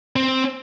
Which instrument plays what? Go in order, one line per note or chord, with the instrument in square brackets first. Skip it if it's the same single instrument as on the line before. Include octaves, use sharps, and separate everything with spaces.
[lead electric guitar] C4